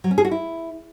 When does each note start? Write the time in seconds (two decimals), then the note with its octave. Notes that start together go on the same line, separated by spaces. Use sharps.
0.04 F#3
0.11 C#4
0.18 G#4
0.25 F#4
0.31 E4